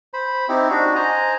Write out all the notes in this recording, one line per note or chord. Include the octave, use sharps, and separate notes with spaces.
C5 B5
C4 D#4 E4 G4
D4 D#4 F#4
C5 D#5 G#5 A#5